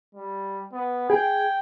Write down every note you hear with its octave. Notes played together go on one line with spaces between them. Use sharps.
G3
B3
G#4 G5